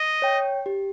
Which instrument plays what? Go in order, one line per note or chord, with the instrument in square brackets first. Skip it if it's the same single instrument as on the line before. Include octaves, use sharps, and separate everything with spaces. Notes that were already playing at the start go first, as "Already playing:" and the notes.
Already playing: [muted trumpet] D#5
[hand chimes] C#5 G5
G4